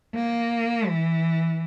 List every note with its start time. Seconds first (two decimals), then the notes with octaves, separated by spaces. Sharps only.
0.15 A#3
0.87 E3